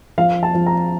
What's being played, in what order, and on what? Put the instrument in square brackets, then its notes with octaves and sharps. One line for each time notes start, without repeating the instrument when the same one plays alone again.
[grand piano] F3 F5
A5
F3
A#5